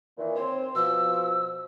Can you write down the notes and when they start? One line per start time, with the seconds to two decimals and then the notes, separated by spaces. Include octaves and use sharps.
0.18 A#2 D#3 E3
0.36 C4 C5 C#5
0.75 B2 F3 E6